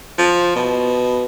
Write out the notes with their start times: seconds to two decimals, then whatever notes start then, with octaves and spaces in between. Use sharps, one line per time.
0.19 F3
0.56 B2